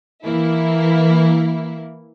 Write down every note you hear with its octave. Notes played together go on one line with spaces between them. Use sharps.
E3 A#3 E4